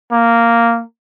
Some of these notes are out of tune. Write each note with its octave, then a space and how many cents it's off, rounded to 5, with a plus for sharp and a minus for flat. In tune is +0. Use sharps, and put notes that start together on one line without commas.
A#3 -5